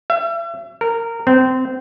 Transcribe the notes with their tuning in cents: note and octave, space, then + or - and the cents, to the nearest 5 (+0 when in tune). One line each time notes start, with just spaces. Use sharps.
E5 +40
A#4 -15
C4 -20